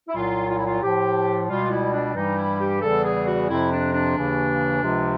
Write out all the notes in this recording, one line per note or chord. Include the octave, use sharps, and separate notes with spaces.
E4
C2 A#2 F#3 F4
F4
E4
F4
A2 F3 G4
C#2 B2 G3 F4
E4
D4
G2 E3 G3 D#4
E4
G4
E2 C#3 E3 G3 A4
G#4
F#4
F2 C3 F3 E4
D4
D4
D#2 C#3 E3
C#2 C3 F3